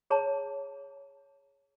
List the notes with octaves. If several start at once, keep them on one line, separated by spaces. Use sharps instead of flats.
G#4 C#5 A5 A#5